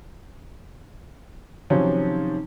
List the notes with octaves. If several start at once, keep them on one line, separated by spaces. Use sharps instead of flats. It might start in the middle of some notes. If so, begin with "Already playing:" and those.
C3 D#3 F3 F#3 C4 C#4